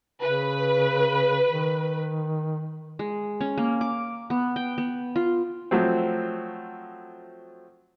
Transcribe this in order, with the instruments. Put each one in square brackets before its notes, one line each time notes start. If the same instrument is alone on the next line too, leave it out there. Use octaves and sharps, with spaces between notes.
[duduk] C#3 [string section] B4
[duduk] D#3
[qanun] G#3
C#4
A#3
D6
B3
G5
B3
F4
[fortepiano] F3 F#3 A3 C4